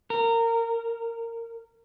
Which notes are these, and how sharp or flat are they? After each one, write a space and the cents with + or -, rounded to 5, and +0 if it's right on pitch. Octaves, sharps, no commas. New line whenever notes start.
A#4 -20